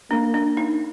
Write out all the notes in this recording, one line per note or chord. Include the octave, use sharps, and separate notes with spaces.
A#3 D4
D4
D#4